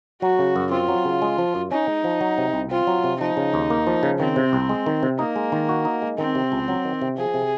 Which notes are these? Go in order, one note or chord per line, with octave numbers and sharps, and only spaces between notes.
F#3 F#4
C#3
F#2
C4 F4
F#3
C#3
G#3
F3
F#2
C#4 D#4
G#3
F3
F#3
C3
C2
C4 F4
F#3
C3
F3 D#4
C#3
D#2
A#3
F3
C#3
D#3 C4
C3
C2
G#3
D#3
C3
A#3 D#4
G#3
D#3
F#4
D#4
G#3
D#3 C4
C3
C#2
F#3
D#3
C3
F3 G#4
C3